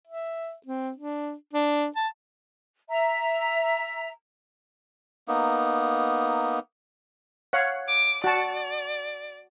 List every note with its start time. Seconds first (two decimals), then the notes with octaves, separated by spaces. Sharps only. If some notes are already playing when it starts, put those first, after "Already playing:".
0.07 E5
0.66 C4
0.96 D4
1.53 D4
1.96 A5
2.89 E5 A#5
5.28 A#3 B3 D#4
7.53 C#5 F5 F#5
7.88 D6
8.24 F#4 D5 A5